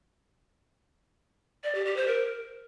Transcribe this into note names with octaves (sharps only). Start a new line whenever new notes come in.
D5
G4
G4
C5
A#4